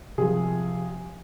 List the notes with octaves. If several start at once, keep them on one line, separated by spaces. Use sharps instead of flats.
C3 F3 G#4